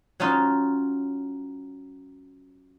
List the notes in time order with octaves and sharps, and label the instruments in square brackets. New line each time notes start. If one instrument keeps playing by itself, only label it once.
[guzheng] F#3 C#4 D#4 F4